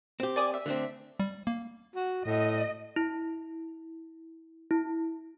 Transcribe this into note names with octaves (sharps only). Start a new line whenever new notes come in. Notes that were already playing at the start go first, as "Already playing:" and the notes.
C4 G4
D5 G#5 D#6
E5
D3 A3 C4
G3
A#3
F#4
A2 D#5
E4
E4